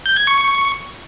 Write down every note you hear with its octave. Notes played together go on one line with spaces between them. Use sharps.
G6
G#6
C#6